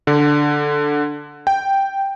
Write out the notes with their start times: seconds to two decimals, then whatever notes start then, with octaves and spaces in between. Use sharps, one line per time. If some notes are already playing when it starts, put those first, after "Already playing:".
0.07 D3
1.47 G5